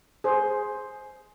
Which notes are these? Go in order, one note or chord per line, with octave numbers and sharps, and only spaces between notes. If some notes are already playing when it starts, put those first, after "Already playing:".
G#4 C5